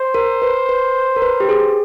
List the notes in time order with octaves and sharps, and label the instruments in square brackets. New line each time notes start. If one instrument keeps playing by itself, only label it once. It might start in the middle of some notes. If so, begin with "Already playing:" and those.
Already playing: [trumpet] C5
[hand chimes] A#4
B4
B4
A#4
B4
G4
G#4